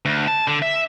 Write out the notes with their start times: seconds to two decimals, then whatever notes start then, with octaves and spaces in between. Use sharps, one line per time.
0.05 D2
0.28 A5
0.48 D3
0.62 E5